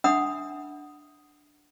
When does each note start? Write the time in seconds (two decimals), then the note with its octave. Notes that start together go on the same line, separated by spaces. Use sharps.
0.04 D4 E5 F#5 B5 D#6